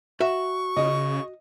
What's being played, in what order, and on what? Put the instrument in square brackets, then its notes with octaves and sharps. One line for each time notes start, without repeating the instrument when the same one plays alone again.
[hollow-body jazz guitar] F#4 E5 [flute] C#6
[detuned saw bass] C#3 [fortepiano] D#5